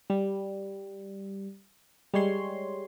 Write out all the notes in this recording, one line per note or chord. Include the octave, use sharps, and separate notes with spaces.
G3
G3 G#3 C#5 C6